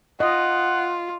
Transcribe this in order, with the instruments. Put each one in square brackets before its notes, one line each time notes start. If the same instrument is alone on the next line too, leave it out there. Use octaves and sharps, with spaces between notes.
[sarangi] F4 [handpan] D#5 [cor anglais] F#5